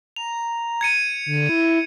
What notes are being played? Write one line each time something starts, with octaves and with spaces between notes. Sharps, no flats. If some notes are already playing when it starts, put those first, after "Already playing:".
A#5 F7
G#6 C#7 D#7
D3
E4